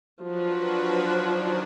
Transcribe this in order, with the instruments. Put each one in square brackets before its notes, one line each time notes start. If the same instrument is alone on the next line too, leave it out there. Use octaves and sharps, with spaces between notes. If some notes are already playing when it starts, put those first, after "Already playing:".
[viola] F3 [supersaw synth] F#3 D4 F#4 B4
[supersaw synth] D#3 F#3 D4